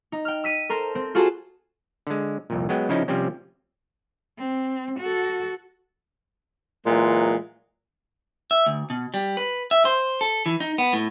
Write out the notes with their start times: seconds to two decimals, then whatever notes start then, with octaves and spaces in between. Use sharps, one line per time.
0.12 D#4
0.25 G5 F6
0.44 E6 B6 D#7
0.69 A4 A#4 C5
0.95 C4
1.15 F4 F#4 G#4 A4 C5 A5
2.07 D3 G#3
2.50 C2 F2 A#2
2.69 F#3 G#3 B3 G5
2.89 C#3 F3 C#4 D#4 E4
3.08 C3 F3 G3 C4 C#4
4.39 C4
4.99 F#4 A4
6.86 A#2 E3 F#3 G#3
8.51 E5
8.66 D2
8.90 B2
9.14 G3
9.37 B4
9.71 E5
9.85 C5
10.21 A4
10.46 E3
10.60 D#4
10.78 B3
10.93 A2